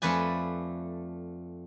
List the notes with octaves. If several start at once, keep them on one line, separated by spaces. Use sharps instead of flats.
F2 A3 B4 D5 G#5